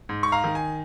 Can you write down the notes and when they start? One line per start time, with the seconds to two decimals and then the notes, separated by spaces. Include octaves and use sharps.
0.09 G#2
0.23 C#6
0.32 F5 A#5
0.44 D#3
0.55 G#5